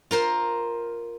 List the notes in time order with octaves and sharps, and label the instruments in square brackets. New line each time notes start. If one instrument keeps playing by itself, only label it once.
[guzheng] F4 A#4 C5